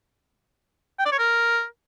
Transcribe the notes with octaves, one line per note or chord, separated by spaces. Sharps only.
G5
D5
C#5
A#4